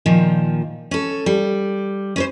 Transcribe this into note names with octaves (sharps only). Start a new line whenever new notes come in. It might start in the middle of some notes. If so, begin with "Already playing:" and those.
A#2 D#3 F3
C#4 A4
G3
C#4 B4 C5